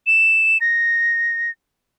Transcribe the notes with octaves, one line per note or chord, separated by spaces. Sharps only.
E7
A#6